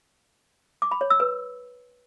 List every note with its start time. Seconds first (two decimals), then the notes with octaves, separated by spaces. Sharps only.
0.82 D6
0.91 B5
1.01 C#5
1.10 E6
1.20 B4